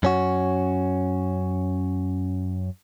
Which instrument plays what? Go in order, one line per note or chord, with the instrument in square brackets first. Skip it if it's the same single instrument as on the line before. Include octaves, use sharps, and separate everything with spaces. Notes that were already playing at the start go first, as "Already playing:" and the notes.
[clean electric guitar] F#2 C#4 F#4